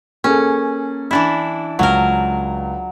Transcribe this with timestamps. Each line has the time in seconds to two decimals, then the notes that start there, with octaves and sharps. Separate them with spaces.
0.24 A#3 C#4 G#4 A4
1.11 E3 D4 E4
1.79 C#2 F#3 A#4